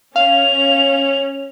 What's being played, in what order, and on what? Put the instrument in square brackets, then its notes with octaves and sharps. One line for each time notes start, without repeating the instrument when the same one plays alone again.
[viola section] C#4 [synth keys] F5 [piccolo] F7